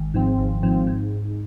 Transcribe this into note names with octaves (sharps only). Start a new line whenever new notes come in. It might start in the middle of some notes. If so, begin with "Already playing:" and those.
Already playing: G#1
G#2 F3 C4
G#1
G#2 F3 C4
G#2